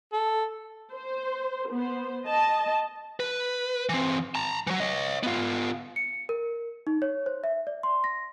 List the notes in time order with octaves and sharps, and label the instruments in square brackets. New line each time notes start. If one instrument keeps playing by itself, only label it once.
[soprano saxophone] A4
[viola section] C5
B3 C5
D#5 A5
[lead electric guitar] B4
E3 C4
A5 A#5
E3 F#3
C#5 D#5
B3 F4
[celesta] C#7
A#4
D#4
C#5
C5
E5
D5
C6
A#6